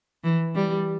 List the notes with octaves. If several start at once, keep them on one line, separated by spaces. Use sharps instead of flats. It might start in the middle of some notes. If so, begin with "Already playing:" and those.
E3
G3